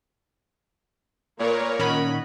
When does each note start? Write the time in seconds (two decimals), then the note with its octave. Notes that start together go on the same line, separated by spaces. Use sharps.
1.39 A#2 A#3 A#4 B4 C#5
1.79 A#2 D#3 C#4 D#5 F#5 B5